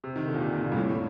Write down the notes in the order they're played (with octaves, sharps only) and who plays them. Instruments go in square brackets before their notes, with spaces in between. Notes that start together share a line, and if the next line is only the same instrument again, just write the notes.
[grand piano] C3
D#3
D3
A#2
C3
A#2
A#2
G2
A2
A2